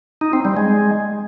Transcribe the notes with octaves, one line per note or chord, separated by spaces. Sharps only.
D#4
C4
G3
G#3